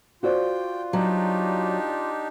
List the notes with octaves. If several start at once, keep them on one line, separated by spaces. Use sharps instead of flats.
F4 F#4 C5 D5 G5
F#3 D4 D#4 G4